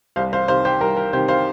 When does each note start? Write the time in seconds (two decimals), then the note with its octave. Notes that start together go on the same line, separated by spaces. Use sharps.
0.16 C2 C5 F5
0.33 C5 F5
0.48 C3 D#3 C5 F5
0.65 G4 C5
0.80 C2 A#4
0.97 A#4
1.13 C3 G4 C5
1.17 D#3
1.28 C5 F5